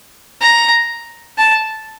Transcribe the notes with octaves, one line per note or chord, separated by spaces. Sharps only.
A#5
A5